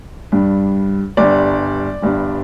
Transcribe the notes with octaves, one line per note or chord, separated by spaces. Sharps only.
G2 G3 D4
G1 G2 G3 D4 D5
G1 G2 G3 D4